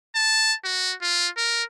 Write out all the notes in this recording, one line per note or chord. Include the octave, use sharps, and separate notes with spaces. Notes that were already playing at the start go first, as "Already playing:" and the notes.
A5
F#4
F4
A#4